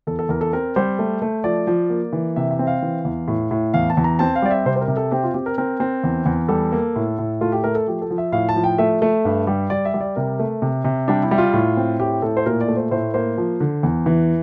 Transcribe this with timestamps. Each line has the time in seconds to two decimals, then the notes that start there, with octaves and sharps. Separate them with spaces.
0.07 E2 A4
0.19 A4
0.29 E2 A#4
0.41 A4
0.53 C4 A#4
0.76 G3 C5
0.99 A3
1.22 A3
1.44 F3 D5
1.67 F3
1.90 A#3
2.13 E3
2.36 C3 E5
2.51 E5
2.59 C4
2.67 F5
2.83 E3
3.05 E2
3.28 A2
3.51 A2
3.74 E2 F5
3.90 A5
3.97 E2
4.04 A#5
4.19 C4 A5
4.36 F5
4.42 G3 D5
4.51 E5
4.65 C3 C5
4.76 C5
4.81 A#4
4.88 C3
4.97 A4
5.11 C4 G4
5.24 F4
5.34 C4 G4
5.46 A#4
5.58 C4 A#4
5.80 C4
6.04 E2
6.26 E2
6.49 G3 A4
6.72 A#3
6.96 A2
7.19 A2
7.41 A3 F4
7.52 G4
7.64 A3 A#4
7.75 A4
7.87 F3 G4
8.02 A4
8.10 F3
8.18 E5
8.32 A2 F5
8.49 A5
8.56 F3
8.64 G5
8.78 A3 E5
9.02 A3
9.25 G2
9.47 G3
9.70 G3 D5
9.85 E5
9.94 G3
10.01 D5
10.16 C3 A#4
10.39 A3
10.62 C3
10.84 C3
11.08 G3 D4
11.23 E4
11.31 G3
11.38 F4
11.53 A2
11.77 C4
11.99 A2 G4
12.22 A2 A4
12.37 C5
12.46 A#2 A#4
12.61 D5
12.68 A3
12.76 C5
12.91 A2 C5
13.14 A#3 C5
13.38 F3
13.60 D3
13.83 E2
14.06 E3